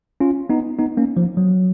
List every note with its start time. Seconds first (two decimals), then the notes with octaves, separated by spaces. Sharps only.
0.20 C#4 F4
0.50 B3 D#4
0.79 B3 D#4
0.97 A#3 C#4
1.17 F3
1.37 F#3